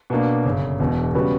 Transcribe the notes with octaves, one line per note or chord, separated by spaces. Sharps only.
B2 A#3 D4
G1 F#2 C#3
E1 E2 B2
C#3 G3 B3 F#4